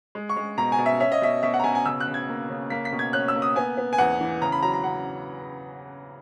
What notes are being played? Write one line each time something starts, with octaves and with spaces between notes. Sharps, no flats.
G#3
C#6
G#3
B2 A#5
G#5
B2
E5
C#4 E5
D#5
B2 E5
B2 E5
F#5
A#5
B2 G#5
G#5
C#3 E6
F#6
C#3
G#6
A#3
C#3
A#3 B6
B6
B2
G#6
C#4 F#6
E6
A#3
D#6
B3 G#5
B3
G#5
E2 F#5
E3
C#3 A#5
B5
F#3 A#5
A#5
C#3 F#5